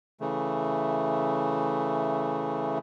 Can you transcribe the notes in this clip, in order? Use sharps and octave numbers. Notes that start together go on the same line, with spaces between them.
C#3 E3 A3